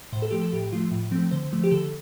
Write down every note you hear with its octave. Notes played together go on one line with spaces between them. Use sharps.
A2 C5
A4
F3 A3 G4
A4
A2 G4
F3 A3 F4
A2
F3 A3 C4
D3 C5
F3 A3
G4
D3 A4